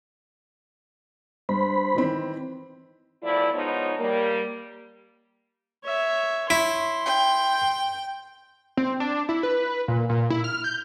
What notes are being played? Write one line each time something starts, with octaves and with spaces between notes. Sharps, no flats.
G2 C5 B5
D#3 E3 C4
E2 A2 F3 E4 D5
G#2 F3 B3 D#4 C#5
G3 A#3
C#5 E5
E4 C6
G5
C4
D4
E4
B4
A#2
A#2
E4
F6
G6